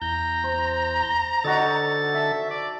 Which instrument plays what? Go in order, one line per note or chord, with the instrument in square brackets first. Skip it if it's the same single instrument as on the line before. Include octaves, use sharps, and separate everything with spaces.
[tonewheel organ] E2 G6 [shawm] A#5
[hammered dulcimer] C5
[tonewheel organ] D3 A4 A6 [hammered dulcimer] D#4 F#4
[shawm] E5 [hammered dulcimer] A5
[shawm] D5